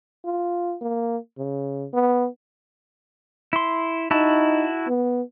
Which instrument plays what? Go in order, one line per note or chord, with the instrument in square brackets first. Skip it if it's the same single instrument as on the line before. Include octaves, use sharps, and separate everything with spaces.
[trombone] F4
A#3
C#3
B3
[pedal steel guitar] E4 C6
[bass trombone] D#4 [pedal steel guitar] E4 F#4 A5
[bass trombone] B3